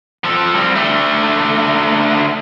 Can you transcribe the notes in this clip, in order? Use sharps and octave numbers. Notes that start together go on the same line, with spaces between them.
F3 A4
G3 C4
D3 A3